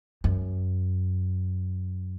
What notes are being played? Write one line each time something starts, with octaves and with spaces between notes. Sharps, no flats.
F#2